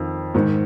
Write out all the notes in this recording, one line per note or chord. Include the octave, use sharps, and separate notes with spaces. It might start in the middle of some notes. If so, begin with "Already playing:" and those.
Already playing: F2 D#3
G#2 D#3